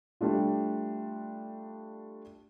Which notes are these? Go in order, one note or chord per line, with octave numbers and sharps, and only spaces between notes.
G3 A3 D4 F4